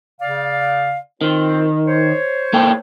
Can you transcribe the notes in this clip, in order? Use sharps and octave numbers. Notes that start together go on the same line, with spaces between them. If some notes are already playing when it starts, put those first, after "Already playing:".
C#3 D5 F5
D#3 C4 F4 C5
C5 C#5
A#3 A4 G5